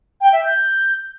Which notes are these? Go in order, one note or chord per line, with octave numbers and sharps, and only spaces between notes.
G5
E5
G6